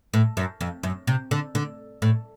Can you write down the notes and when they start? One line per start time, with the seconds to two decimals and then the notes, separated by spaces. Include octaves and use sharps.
0.14 A2
0.37 F#2
0.61 F2
0.83 F#2
1.07 C3
1.31 D3
1.55 D3
2.02 A2